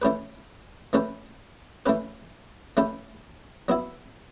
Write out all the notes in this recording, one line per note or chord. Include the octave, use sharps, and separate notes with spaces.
E3 A3 C#4 G4 B4
E3 A3 C#4 G4 B4
E3 A3 C#4 G4 B4
E3 A3 C#4 G4 B4
F#3 B3 E4